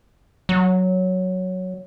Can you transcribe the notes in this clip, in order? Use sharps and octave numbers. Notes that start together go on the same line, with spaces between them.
F#3